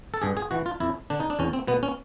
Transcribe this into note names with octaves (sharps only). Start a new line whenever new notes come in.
A4
G2 G#4
G#4
E3 F#4
F4
F2 E4
D3 D4
D#4
D4
E2 C#4
C4
B2 B3
C#4